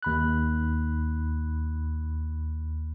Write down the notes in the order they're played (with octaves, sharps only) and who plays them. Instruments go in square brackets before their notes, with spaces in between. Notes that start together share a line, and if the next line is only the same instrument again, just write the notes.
[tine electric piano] D#2 B5 F#6